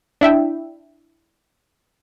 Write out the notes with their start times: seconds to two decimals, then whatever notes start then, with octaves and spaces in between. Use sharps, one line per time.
0.21 D4 E4 E5 G5